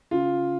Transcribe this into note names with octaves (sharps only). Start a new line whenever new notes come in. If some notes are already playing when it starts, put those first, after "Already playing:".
C#3 F4